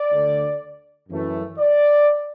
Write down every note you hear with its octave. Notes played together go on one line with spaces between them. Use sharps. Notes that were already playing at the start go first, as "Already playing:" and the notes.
Already playing: D5
D2 D3 A3
F#2 E3 A3
D5